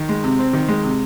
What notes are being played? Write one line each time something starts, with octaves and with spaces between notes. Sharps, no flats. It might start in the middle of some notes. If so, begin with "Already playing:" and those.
Already playing: D#3
G#3
C3
C4
D#3
G#3
C3